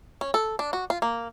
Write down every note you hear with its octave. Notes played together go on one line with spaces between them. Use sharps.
C#4
A4
D4
F#4
F4
A#3